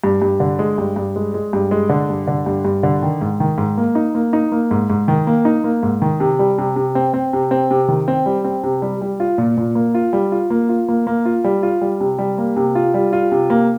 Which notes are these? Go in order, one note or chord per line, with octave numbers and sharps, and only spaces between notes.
G2
G2
D3
G#3
G2
G2
G#3
G#3
G2
G#3
D3
G2
D3
G2
G2
D3
D#3
G#2
D#3
G#2
A#3
D#4
A#3
D#4
A#3
G#2
G#2
D#3
A#3
D#4
A#3
G#2
D#3
C3
G3
C3
C3
C4
C4
C3
C4
C3
D#3
C4
G3
C4
C3
G3
G3
F4
A#2
A#2
A#3
F4
G3
F4
A#3
F4
A#3
A#3
F4
G3
F4
G3
C3
G3
A#3
C3
F4
G3
F4
C3
A#3